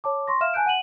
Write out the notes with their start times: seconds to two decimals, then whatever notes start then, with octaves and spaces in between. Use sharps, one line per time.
0.04 C#5 A5 D6
0.28 C6 C#6 A#6
0.41 E5 F5 F6 E7
0.54 G#5 A5 F#6 G6 D7
0.66 F#5 D#7 F#7